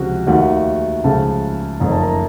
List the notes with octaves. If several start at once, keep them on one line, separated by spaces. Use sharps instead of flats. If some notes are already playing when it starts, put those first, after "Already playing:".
Already playing: C#2 C3 F3 F#4
D#2 D#3 A3 F#4 F#5
C#2 C#3 F3 A3 A4 A5
F#1 F2 D#3 A3 A#5
A5
A#4 A#5